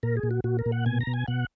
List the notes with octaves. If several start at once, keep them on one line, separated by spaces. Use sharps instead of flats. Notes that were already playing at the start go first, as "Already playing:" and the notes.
A#2 A#4
G#4
A#2
F#4
A#2 F#4
A#4
A#2
F#5
B2 G#5
A#5
B2
G#5
B2 F#5